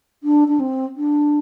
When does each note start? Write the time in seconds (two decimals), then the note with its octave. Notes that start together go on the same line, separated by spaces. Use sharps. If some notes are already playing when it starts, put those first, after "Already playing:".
0.23 D4
0.48 D4
0.60 C4
0.97 D4